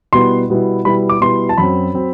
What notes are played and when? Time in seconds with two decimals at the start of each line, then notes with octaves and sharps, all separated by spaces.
0.13 B2 G3 B3 E4 C6
0.50 B2 G3 B3 E4
0.85 B2 G3 B3 E4 B5
1.09 D6
1.21 B2 G3 B3 E4 C6
1.49 A5
1.58 F#2 F#3 C4 B5
1.94 F#3 C4